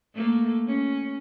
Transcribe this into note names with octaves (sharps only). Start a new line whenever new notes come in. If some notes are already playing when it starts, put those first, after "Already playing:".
A3 A#3
C#4